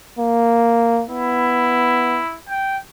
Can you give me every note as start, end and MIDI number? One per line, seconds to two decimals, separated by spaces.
0.19 1.04 58
1.09 2.22 59
1.09 2.37 64
2.48 2.77 79